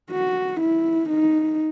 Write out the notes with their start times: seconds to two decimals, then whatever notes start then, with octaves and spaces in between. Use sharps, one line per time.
0.11 F#4
0.61 E4
1.09 D#4